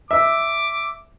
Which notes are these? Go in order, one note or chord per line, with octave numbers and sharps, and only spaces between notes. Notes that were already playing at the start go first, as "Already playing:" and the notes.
E5 D6